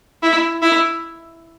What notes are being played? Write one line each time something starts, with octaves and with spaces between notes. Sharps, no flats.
E4
E4